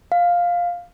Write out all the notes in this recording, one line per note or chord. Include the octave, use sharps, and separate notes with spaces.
F5